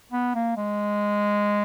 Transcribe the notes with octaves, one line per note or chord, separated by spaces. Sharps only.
B3
A#3
G#3